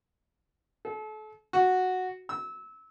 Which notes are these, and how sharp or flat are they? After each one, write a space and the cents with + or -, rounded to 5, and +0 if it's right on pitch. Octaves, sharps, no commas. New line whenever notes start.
A4 -35
F#4 -5
E6 -25